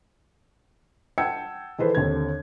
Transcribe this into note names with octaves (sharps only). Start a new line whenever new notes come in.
F#5 G5 A5 E6 G#6 C#7
D#3 E3 G#4 A4 B4 C5
D#2 D3 C4 A4 G#6